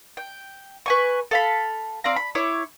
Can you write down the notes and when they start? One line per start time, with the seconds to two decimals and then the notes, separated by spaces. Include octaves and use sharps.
0.17 G5
0.86 B4 G#5 C#6
1.31 A4 F5 B5
2.04 C4 D5 F5 A#5
2.16 B5
2.35 E4 C#5 D6